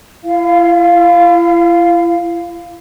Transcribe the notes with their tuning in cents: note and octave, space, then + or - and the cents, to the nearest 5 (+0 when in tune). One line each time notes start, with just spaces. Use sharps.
E4 +40 F5 +0